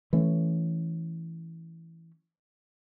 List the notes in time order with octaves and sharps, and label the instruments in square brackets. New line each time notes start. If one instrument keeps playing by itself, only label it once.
[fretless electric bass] E3 A3 C#4